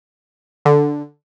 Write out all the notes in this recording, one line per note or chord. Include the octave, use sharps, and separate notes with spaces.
D3